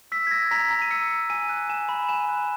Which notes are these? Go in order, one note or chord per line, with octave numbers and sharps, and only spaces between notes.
E6 B6
G#6
E6 A#6
A#5 B6
A#5
D#7
E6 C#7
E6
G#5 D#7
F#6
G#5 E7
B5
G#5 E7
F#6